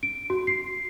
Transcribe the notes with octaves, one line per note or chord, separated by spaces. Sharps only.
D7
F#4
C7